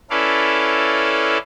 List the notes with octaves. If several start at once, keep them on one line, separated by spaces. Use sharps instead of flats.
C#4 E4 A4 B4 D5 F5